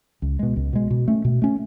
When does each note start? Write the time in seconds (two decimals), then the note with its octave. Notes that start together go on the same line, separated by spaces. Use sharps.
0.22 C#2
0.39 B2 G#3
0.56 C#2
0.73 B2 G#3
0.90 B2
1.08 A3 C#4
1.25 B2
1.42 A3 C#4